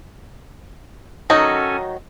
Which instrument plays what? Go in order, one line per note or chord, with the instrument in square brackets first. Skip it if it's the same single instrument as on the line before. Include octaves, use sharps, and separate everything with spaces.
[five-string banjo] D#3 F#3 D#4 [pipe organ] C#4 A4 G#5 [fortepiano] D#5